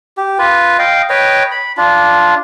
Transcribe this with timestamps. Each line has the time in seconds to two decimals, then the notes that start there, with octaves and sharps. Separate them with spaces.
0.17 G4
0.39 F4 B4
0.79 D#5 F5 G5
1.10 B4 C#5 D#5 G5
1.51 B5
1.77 D4 F4